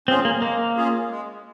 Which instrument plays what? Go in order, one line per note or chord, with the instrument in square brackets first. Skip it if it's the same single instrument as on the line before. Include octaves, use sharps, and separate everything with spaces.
[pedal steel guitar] C4 [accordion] C#4 F4 G#4
[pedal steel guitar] A#3
[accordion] G#3 [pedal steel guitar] A#3
[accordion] C#4 F4 G#4
G#3